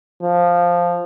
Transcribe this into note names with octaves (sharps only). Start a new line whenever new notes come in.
F3